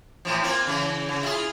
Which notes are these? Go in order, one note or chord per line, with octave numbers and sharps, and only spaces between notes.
A2 E3 F3
A#3 C4 F4
C#3 E3
C#3
E4 F4 G#4